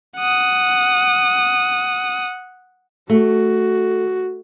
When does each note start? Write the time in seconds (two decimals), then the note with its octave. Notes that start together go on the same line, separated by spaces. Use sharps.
0.17 F#5 D#6
3.10 A3 F#4